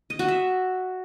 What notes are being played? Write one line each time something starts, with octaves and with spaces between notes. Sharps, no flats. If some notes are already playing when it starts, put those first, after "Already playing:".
D#5
F#4
E5